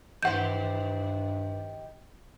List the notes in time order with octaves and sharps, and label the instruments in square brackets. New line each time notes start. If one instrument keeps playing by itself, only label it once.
[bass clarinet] G2 [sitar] D#3 G4 C5 [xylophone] F#5 G6